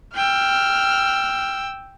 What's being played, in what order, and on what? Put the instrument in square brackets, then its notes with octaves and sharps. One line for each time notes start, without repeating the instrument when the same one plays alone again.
[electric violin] G5 E6 [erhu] F6